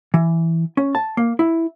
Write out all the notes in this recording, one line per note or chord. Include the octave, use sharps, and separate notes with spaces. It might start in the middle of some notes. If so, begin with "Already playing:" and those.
E3
C#4
A5
A#3
E4